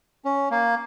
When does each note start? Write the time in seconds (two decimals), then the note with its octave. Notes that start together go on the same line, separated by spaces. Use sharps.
0.25 C#4
0.51 A#3